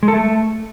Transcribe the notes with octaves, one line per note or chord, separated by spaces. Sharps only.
G#3
A4
A3